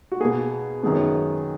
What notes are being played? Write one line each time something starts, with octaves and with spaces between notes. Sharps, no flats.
F#4
B2 A#3 G#4
F#2 D#3 G#3 B3